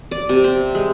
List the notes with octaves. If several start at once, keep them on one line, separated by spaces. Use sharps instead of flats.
D5
C3
C4
G#3